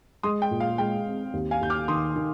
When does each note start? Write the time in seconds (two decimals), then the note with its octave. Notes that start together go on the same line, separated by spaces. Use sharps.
0.23 G#3 C6 D#6
0.42 G5
0.51 A#2
0.60 F5
0.78 G#3 G5
1.05 C4
1.33 D#2
1.51 F5 G#5
1.61 D#2 G6
1.70 D6 F6
1.88 D#3 C6 D#6
2.16 D#3